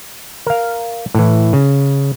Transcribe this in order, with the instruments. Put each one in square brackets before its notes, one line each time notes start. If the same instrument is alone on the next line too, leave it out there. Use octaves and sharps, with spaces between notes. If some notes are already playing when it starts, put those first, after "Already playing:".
[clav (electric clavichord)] A#4 F5
A2 E3
C#3